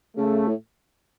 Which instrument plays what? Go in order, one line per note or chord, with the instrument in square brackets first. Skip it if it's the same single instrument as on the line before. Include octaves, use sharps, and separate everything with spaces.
[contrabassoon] C#3 [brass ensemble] A3
[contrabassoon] A2